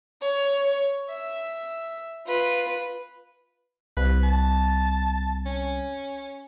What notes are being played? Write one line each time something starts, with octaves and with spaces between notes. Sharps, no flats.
C#5
E5
F4 B4
C2 B4
A5
C#4